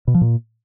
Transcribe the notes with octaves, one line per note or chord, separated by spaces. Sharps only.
B2
F3
A#2